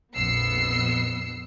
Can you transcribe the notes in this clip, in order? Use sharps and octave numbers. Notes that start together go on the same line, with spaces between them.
A#1 F2 B3 E6 C7 C#7